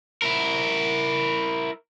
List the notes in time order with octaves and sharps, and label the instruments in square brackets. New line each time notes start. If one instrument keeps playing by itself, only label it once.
[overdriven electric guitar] E4 A#4